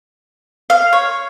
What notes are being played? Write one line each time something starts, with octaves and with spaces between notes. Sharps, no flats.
F5
C#5